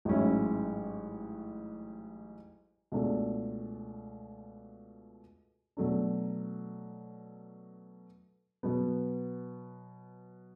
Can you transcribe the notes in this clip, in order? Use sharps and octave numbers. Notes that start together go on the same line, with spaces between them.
A1 G#2 F#3 C#4 E4
C#2 B2 A3 D4
B2 F#3 A3 D4
B2 F#3 B3